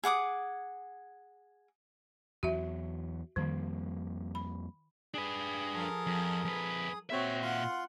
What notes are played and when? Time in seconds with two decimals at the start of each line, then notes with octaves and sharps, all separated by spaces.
0.04 G#4 F#5 D6 D#6
2.43 E2 F#3 F#4 E5
3.36 F2 D#3 G3 A#3
4.35 B5
5.14 D4 G#4 B4
5.73 F3 A4 A#4
6.07 F2
6.45 F2 B4
7.10 A#2 C4 F#4 C#5 E5
7.43 F4 F#5 C6